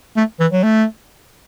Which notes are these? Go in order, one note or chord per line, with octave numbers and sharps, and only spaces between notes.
A3
E3
F#3
A3